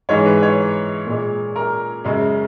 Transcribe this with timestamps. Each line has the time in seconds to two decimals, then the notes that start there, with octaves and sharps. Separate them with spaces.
0.09 G#2 E3 G#3 C#5
0.26 B4
0.42 C#5
1.07 A#2 G#3
1.56 A#4
2.04 F#2 C#3 G#3